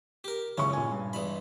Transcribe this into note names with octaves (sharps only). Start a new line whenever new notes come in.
G4 A#4
F#1 C#2 C#4 C#6
A#2 G#5
G2
E2 G#3 B5